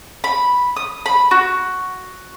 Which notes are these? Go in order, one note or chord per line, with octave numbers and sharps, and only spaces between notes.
B5
D#6
B5
F#4